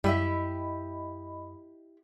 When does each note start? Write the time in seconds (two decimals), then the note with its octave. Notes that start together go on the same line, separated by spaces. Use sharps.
0.04 F#2 G3 E4 G4 D#5 E5 B5